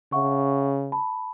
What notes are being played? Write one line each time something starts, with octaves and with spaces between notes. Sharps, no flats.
C#3 E5 F#5 C#6
A5 B5